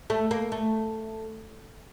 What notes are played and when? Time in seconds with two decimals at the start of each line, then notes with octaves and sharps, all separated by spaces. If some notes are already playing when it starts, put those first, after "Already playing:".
0.10 A3
0.31 A#3
0.52 A3